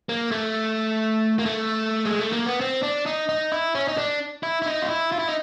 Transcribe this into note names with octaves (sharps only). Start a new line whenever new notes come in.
A#3
A3
A#3
A3
G#3
A3
A#3
B3
C4
D4
D#4
D#4
E4
C#4
D#4
D4
E4
E4
D#4
F4
E4
F4
E4
D#4